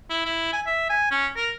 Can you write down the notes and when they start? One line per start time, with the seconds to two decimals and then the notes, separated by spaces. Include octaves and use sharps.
0.10 E4
0.25 E4
0.53 G#5
0.66 E5
0.89 G#5
1.11 C#4
1.36 A#4